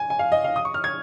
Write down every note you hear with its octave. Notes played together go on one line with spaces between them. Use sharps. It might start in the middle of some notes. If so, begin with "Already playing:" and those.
Already playing: G#5
G#5
F5
D#5
F5
D#6
C#6
F6
G#6